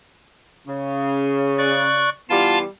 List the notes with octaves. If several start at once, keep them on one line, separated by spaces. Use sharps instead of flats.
C#3
D5 C#6 F#6
E3 G3 B3 F4 F5 A5